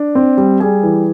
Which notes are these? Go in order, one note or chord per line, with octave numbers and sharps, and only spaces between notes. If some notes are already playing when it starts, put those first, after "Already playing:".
Already playing: D4 D5
C4
G3
G3 G#4 G#5
E3